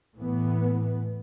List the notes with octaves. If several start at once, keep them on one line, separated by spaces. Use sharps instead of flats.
A2 E3 B3